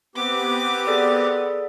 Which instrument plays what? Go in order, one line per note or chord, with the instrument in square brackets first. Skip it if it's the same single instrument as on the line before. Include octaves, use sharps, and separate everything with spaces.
[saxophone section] B3 [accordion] C4 G4 [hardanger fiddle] D6
[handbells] G#4 A4 D5